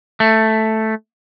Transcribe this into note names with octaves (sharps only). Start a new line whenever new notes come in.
A3